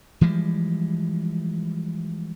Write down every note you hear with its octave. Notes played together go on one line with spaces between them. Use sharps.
E3 F3 G3 G#3